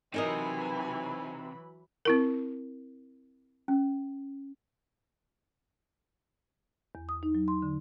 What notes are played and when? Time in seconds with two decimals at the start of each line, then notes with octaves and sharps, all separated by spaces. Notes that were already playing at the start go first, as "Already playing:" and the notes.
0.14 C3 E3 F#3 D#4 A#4 D#5 G#5 B5
2.05 C4 E4 A#4
3.68 C#4
6.95 E2
7.09 D#6
7.23 D#4
7.35 F#3
7.48 C6
7.62 D3